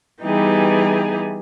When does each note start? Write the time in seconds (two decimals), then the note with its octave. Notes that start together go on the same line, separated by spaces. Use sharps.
0.21 E3 G3 B3 D#4 G4 G#4